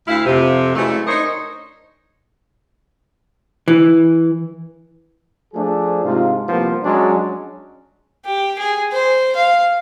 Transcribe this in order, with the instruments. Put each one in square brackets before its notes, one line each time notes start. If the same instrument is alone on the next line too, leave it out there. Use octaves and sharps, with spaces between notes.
[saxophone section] D2 E4 F5
F2 C3
C#3 E3 F#3 G#3 A3
D4 D#4 A#4 C5 C#5 D#5
[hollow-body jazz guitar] E3
[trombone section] F3 A3 D4 G#4
G#2 C3 F4
C2 F3 A#3 B3
F#3 G#3 C#4 D4
[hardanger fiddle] G4
G#4
C5
F5